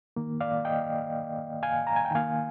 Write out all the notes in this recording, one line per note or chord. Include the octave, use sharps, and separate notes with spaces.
D#3 A#3
D5 F5
D#5 G5
F5 G#5
A#5
G#5
G5
D#3 A#3 F5 G#5